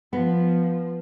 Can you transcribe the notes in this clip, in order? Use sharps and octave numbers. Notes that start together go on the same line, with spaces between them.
F3 B3